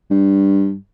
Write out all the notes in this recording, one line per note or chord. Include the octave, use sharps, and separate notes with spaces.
G2